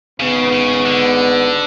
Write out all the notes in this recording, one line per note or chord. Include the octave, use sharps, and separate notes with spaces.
G#1 G#2 C#3 G#3 B3
C#3
D3